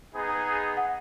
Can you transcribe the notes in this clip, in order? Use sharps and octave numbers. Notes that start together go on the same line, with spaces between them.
B3 D#4 G#4
F#5